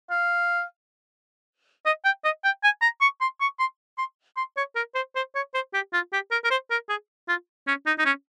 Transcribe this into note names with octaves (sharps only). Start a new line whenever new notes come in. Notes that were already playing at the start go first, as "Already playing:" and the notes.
F5
D#5
G5
D#5
G5
G#5
A#5
C#6
C6
C#6
C6
C6
C6
C#5
A#4
C5
C5
C#5
C5
G4
F4
G4
A#4
A#4
C5
A#4
G#4
F4
C#4
D#4
D#4
C#4